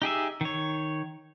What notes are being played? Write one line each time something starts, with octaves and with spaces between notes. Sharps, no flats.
D#4 G4 G#4 E5
D#3 C#5